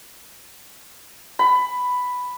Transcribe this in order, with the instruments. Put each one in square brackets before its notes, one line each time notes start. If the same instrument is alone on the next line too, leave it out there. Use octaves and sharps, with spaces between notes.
[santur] B5